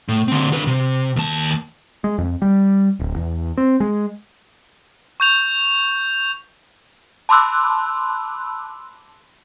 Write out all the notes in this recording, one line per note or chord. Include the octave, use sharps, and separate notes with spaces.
A2
D3 C4
D3 B4
C3
D#2 A5
G#3
F2
G3
D1
E2
C4
G#3
C#6 G6 F7
A5 B5 C6 D6 E6 F#6